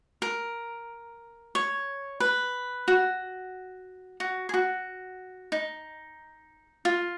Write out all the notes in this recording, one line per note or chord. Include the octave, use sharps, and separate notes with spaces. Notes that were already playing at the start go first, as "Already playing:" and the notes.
A#4
C#5
B4
F#4
F#4
G#4
F#4
D#4
F4